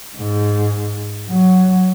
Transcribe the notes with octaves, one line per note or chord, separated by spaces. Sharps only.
G#2
F#3